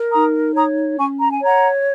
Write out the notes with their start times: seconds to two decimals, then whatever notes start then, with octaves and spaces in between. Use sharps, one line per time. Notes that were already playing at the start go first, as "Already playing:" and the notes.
Already playing: A#4
0.12 D#4 A#5 D#6
0.55 C#5 A#5 D#6
0.98 C#4 G#5 C#6
1.20 A#5
1.31 G#5
1.41 C#5 F#5 A#5